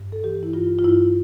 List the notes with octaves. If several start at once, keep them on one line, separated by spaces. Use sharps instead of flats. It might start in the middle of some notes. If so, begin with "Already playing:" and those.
Already playing: G2
A4
E3 G4
E4
G2 F4
F4
G2 E4